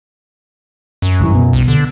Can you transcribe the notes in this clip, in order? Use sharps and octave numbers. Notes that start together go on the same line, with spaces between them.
F#2
C#2 G2 E3
B2
C2
D3